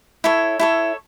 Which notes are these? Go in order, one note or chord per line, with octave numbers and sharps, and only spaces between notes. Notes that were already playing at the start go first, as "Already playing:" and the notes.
E4 A4 C#5
E4 A4 C#5